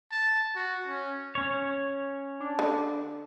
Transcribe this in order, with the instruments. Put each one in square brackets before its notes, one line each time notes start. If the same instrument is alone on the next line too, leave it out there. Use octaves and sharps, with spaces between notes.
[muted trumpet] A5
F#4
C#4
[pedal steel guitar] C#4 C#5
[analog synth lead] D4
[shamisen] D3